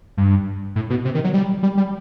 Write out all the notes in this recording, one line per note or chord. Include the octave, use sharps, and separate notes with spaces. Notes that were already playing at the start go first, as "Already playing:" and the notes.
G2
A2
B2
C3
D#3
F#3
G3
G3
G3